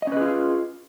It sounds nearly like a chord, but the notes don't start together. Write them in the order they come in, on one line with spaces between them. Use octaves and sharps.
D#5 C#4 B4 G#4 F4